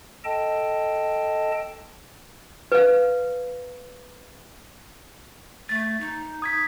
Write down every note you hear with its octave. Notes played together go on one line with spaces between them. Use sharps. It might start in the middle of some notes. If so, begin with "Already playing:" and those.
A4 D#5 G5 A5
B4 F5
A3 A6
D#4
D#6 G#6 B6